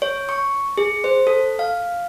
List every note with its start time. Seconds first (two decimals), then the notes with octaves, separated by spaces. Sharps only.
0.02 C#5
0.29 C#6
0.78 G#4
1.04 C5
1.27 A4
1.59 F5